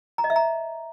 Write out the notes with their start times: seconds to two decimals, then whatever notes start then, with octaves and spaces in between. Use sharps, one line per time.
0.18 A#5
0.24 D#5
0.30 E5
0.36 A#5